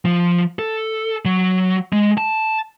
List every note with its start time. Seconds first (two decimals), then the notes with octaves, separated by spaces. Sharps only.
0.05 F3
0.59 A4
1.25 F#3
1.93 G#3
2.18 A5